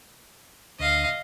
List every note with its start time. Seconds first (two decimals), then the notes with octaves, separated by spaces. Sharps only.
0.79 D2 D#5 F5